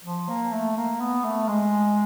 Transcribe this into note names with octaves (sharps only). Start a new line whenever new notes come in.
F3
A#3
A3
A#3
B3
A3
G#3